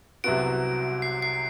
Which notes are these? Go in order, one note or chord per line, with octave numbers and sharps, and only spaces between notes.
C2 C3 F#3 B3 F#4 D7
C7
C7